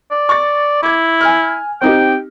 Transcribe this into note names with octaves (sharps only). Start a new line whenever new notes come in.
D5
C#6 A6
E4 D6 G#6
G#5 F6
C4 D#4 G4 G5